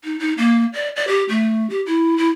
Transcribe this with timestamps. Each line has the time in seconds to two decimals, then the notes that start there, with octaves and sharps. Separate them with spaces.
0.04 D#4
0.19 D#4
0.38 A#3
0.74 D5
0.96 D5
1.08 G4
1.29 A3
1.70 G4
1.86 E4
2.18 E4